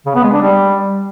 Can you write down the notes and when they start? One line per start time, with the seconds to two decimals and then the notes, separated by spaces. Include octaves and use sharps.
0.06 C#3
0.15 B3
0.23 G#3
0.32 D4
0.41 G3